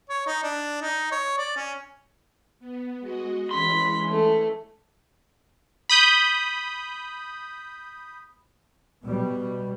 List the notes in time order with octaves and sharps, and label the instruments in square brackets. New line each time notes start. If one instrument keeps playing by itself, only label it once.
[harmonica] C#5
D#4
D4
D#4
C#5
D5
C#4
[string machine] B3
G#3 F#4 D#5
[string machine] E3 G#3 C#4 [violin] B5 B6 [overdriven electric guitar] C6
[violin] A3
[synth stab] B5 D#6 G6
[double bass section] B2 G3